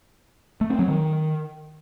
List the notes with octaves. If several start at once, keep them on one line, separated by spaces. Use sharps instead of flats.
A3
C4
F#3
D#3